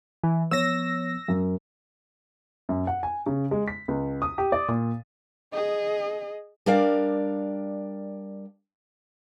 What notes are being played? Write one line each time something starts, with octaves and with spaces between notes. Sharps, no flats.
E3 G#5
F3 B3 C#5 E6 A#6
F#2
F#2
F#5
G#5
C#3
G#3
B6
C#2
D#6
G4
D5
A#2
G#4 D#5
G3 D4 A#4 D5 F5